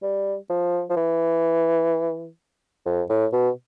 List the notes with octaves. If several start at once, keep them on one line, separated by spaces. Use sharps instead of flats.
G3
F3
F3
E3
F2
A2
B2